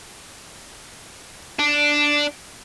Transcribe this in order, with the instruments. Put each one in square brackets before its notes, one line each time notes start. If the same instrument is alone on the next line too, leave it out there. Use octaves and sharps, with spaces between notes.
[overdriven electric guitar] D4